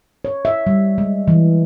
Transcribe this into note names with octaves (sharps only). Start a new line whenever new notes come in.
C#5
E5
G3
G#3
E3